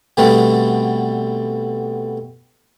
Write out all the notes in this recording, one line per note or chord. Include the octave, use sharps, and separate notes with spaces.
B2 D3 G3 A3 B3 C4